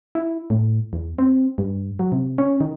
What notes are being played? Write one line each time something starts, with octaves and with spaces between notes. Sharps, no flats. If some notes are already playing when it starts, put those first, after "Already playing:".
E4
A2
E2
C4
G2
F#3
C3
C#4
D#3